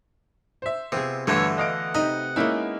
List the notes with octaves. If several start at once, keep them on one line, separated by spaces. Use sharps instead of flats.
C5 E5
C3 B3 F4 G#4
G2 D3 E3 A3 F#4 B4 C#5
D#5 F5 F#5 D7
C3 D#4 B4 D#5
G#3 A#3 B3 C#4 D#4 E4